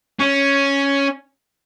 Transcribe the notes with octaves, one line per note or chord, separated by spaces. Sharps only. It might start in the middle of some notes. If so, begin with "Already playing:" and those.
C#4